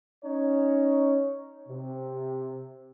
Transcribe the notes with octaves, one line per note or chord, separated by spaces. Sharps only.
C#4 D#4 C#5
C3